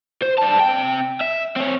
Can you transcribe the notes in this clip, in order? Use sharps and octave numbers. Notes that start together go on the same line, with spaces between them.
C5
G3 A5
C3 G5
E5
C4 C#5